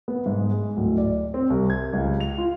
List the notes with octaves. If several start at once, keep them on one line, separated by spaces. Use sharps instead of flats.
B3
G#2
G#3
D1
D5
C4
C2
G#6
C#2
F7
F4